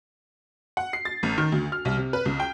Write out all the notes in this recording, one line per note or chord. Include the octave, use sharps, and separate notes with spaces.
F#5
C7
A6
A1
D#3
D2
F6
C2
C3
B4
C#2
G5